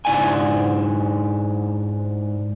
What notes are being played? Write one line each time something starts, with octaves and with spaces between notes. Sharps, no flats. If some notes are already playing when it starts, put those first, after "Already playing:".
G#2 D4 E4 D5 G5 G#5